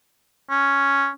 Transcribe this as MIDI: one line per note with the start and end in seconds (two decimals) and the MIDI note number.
0.50 1.09 61